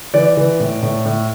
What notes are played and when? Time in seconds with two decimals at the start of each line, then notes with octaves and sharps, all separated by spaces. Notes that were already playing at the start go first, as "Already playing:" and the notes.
0.14 E3 D5
0.37 E3
0.60 A2
0.82 A2
1.05 A2